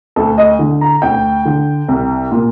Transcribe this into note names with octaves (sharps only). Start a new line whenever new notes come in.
D2 A4
D#5
D3
A#5
D2 G5
D3
C2
A#2